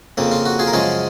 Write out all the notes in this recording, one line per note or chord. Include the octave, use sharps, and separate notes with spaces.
F2 C#3 F3 A#3
F4
F#4
F4 G#4
A#4
F#2 C#3 F3 G#3 F4 G#4